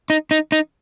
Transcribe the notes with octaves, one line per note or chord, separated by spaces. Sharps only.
D#4
D#4
D#4